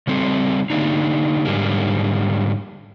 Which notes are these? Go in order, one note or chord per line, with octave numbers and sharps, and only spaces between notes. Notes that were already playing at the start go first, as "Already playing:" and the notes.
C#3 G3 C4 A4
D3 A#3 D4 D#4
G#2 D3 G3 A#3